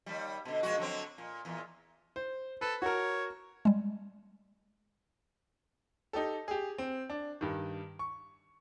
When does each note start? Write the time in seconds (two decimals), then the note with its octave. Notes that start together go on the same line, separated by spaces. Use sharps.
0.06 D#2 G3
0.45 B2 D3
0.63 A#2 G#3 F#4
0.77 D3 F#3 C4
1.18 A#2
1.45 E2 A#2
2.16 C5
2.61 A4 B4
2.82 F#4 A#4 C#5
3.65 G3 G#3
6.13 D#4 G4 A4
6.48 G4 G#4
6.78 C4
7.10 D4
7.41 G2 D#3
7.99 C#6